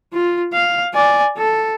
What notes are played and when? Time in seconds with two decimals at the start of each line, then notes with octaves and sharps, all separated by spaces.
0.13 F4
0.53 F5
0.94 D5 G#5
1.37 A4